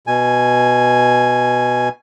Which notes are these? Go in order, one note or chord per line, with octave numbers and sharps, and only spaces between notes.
B2 G#5